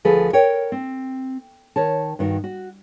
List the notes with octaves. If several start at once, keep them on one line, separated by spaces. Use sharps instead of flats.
D2 F3 G#4 A4 B4
A#4 C#5 G5
C4
D#3 C#5 A5
G2 D#3 F#4
F#4